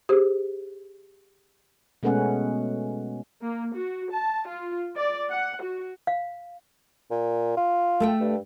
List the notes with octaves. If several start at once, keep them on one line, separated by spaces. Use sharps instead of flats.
G4 G#4 C5
B2 G#3 A3 B3 C#4 F#5
A#3
F#4
A5
F4
D5
F#5
F#4
F5
A#2
F4
A3 A4 G5
G2